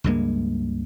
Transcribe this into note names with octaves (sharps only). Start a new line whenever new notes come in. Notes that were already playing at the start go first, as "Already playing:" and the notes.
C#2 G2 G#3 A#3